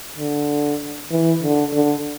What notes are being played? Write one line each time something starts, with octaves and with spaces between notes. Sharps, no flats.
D3
E3
D3
D3